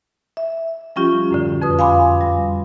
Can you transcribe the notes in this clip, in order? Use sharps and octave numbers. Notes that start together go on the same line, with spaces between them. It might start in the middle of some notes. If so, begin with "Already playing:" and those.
E5
F3 G3 C#4 F4 G4
F#2 A2 D3
F2 B4 D#6
F5 G#5 B5 C6 D6
G3